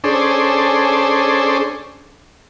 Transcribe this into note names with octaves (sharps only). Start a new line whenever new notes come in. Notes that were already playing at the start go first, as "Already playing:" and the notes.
C#4 D4 G#4 A4 C5